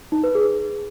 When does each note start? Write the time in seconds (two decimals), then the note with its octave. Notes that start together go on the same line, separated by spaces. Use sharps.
0.12 D#4
0.24 B4
0.35 G#4